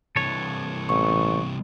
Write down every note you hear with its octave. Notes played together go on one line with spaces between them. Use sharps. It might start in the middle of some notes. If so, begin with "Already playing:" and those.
C2 E3 A4 C#5
A1 C#6